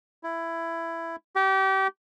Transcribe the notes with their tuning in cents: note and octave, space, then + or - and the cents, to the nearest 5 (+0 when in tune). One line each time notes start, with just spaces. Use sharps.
E4 +10
G4 -30